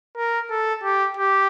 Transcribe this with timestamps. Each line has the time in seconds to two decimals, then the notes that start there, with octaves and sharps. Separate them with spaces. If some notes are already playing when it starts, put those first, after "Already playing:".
0.17 A#4
0.50 A4
0.83 G4
1.17 G4